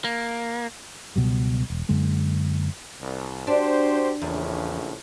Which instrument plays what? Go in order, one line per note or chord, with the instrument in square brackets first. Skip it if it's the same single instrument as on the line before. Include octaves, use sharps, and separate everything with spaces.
[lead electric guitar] A#3
[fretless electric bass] C#2 B2 F#3 G3
E1
F#2 D3 G#3 A#3
[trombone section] C2
[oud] D4 [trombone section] F#4 G4 C5
[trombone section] A#1 A2 C#3 [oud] E2